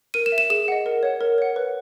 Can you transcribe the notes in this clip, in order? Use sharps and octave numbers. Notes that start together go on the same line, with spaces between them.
A#4 D#7
E7
E5
E7
G#4 E7
D#5 F#5
A#4
C#5 F#5
A#4
C#5 F#5
B4